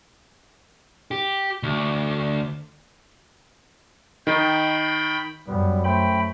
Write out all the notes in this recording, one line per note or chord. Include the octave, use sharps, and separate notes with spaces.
G4
D2
D#3 G5 B5
F#2 G3 B3
A3 C5 G5 B5